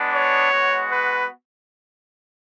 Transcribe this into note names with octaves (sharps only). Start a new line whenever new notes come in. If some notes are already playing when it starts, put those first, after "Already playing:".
Already playing: G#3 B3 D4
C#5
G#3 B3 F#4
B4